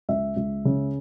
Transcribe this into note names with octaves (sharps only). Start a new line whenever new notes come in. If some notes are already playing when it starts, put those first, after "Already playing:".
C#2 E5
C#2
C#3